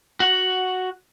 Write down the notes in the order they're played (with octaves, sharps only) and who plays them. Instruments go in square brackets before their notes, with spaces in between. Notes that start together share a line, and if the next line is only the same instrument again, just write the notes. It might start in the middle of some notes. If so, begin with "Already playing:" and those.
[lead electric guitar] F#4 F#5